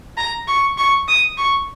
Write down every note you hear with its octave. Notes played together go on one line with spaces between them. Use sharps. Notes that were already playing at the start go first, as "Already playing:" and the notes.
A#5
C#6
C#6
D#6
C#6